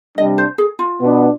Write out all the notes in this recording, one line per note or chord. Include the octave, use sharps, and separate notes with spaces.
C3 G3 D4 D#5
C5
G#4
F4
B2 B3 D4